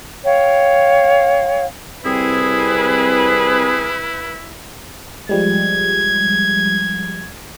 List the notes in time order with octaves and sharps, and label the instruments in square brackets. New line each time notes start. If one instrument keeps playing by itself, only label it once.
[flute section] C#5 F5 G5
[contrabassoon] C2 [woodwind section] C4 G#4 [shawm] E4 [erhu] B4
[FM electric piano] F3 G3 G#3 [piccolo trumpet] G#6